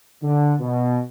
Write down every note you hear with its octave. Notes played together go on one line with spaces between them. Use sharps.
D3
B2